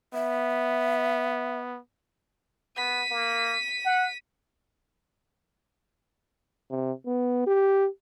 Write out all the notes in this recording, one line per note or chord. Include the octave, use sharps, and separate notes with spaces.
B3 E5
B3 B6 D#7
A#3
F#5
C3
B3
G4